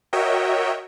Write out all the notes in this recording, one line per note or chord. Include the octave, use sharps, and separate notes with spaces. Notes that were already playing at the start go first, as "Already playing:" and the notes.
F#4 A#4 C#5 D#5 E5 G5